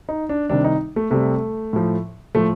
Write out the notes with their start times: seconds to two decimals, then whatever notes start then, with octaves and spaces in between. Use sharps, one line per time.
0.09 D#4
0.29 D4
0.49 C3 D#3 G3 D4
0.64 D#4
0.96 A3
1.11 C3 G3 A3
1.73 A2 F3
2.35 A2 F3 A3